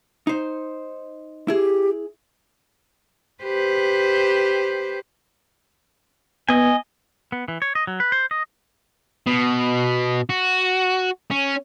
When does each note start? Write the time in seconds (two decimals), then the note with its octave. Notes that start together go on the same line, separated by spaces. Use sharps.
0.27 D#4 C5
1.48 E4 G4 G#4
3.43 G4 B4 C5
6.49 B3 D#5 G#5
7.32 B3
7.48 E3
7.62 C#5
7.75 D#5
7.87 F#3
8.00 B4
8.12 C5
8.31 D#5
9.27 B2
10.30 F#4
11.31 C#4